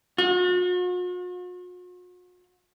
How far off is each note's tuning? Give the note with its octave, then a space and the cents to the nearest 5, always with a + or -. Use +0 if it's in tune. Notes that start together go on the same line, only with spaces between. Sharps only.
F#4 -45